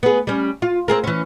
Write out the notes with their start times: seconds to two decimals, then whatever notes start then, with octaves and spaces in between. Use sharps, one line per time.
0.03 B3 G#4
0.27 G3 C#4
0.62 F4
0.88 C4 G#4 A#4
1.04 E3 C#4